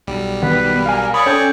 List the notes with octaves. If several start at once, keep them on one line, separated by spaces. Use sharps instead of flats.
B1 G3
D#3 B3 B4
A#4 F5 G#5
C#5 D5 B5 C#6 D#6
C#4 A4 G5 G#5